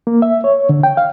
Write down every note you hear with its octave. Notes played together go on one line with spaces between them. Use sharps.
A#3
E5
C#5
D3
G5
F5